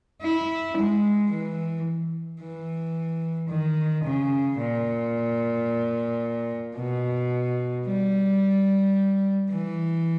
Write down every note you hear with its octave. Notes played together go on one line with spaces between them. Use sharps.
E4
G#3
E3
E3
D#3
C#3
A#2
B2
G3
E3